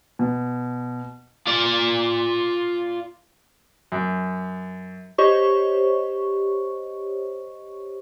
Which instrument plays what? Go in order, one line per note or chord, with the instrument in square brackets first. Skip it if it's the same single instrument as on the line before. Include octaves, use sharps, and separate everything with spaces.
[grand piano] B2
[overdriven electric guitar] F4 D5
[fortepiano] F#2
[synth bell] G4 C5 C#5 D#5 C#6